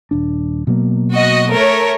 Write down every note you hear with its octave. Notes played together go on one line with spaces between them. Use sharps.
D#1 D4
B2 F#3 A#3
F#4 D#5
A3 A#4 C#5